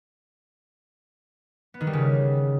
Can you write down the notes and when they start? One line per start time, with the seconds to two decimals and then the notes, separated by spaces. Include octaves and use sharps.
1.74 B3
1.81 D#3
1.87 G3
1.93 C#3